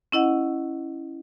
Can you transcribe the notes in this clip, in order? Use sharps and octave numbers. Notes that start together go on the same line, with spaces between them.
C#4 E4 D#5 F#5